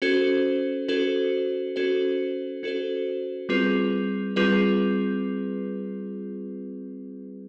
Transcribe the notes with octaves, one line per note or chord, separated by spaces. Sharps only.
C#4 F#4 A4 C5
C#4 F#4 A4 C5
C#4 F#4 A4 C5
C#4 F#4 A4 C5
G3 C4 F4 G#4 B4
G3 C4 F4 G#4 B4